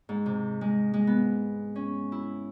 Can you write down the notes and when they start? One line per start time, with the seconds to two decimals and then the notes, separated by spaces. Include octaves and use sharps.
0.09 G#2
0.26 C3
0.61 G#3
0.94 G#3
1.07 B3
1.76 C#4
2.12 E4